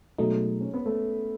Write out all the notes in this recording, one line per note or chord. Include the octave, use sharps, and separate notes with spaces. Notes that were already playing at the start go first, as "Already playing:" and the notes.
B2 F#3 G#3 A3 D#4
C#4
B3
A3